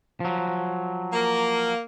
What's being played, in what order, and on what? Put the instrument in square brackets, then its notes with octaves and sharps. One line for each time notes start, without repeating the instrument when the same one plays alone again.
[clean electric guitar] F3 F#3
[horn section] A#3